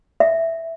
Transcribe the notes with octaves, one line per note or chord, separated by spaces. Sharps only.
E5